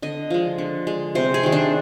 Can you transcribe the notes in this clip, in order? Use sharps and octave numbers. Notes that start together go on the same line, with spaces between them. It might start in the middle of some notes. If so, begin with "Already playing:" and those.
D3 D#5
F3 G#3
D3
G#3
C3 C5
G#4
D#3 G3
D4